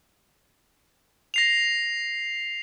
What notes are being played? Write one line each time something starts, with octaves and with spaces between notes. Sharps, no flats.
A#6 C7 F7